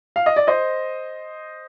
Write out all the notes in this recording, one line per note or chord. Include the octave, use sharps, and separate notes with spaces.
F5
D#5
D5
C5 D#5